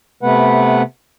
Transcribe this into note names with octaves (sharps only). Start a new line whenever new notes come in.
C3 A3 B3 B4 F#5